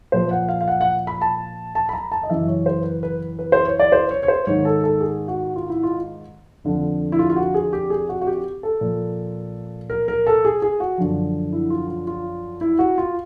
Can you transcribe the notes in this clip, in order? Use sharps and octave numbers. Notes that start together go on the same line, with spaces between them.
A#2 F3 C5
F#5
F5
F5
F#5
F#5
B5
A5
A5
B5
A#5
A5
D#5
F#2 C#3 E3 E5
C#5
C5
B4
B4
B4
C5
C#5
D5
C5
C#5
C#5
C5
G#2 D#3 C#5
A4
A4
G#4
F#4
F4
E4
F4
F2 D3 F3
E4
F4
F4
F#4
G#4
G4
G#4
F#4
F#4
G4
A4
A#2 F3
A#4
A#4
A4
G#4
G#4
F#4
F#2 D3 F3
E4
F4
F4
F4
E4
F#4
F4